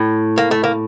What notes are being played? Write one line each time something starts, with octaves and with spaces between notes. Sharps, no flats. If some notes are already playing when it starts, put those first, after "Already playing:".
Already playing: A2
A#3
A3
A#3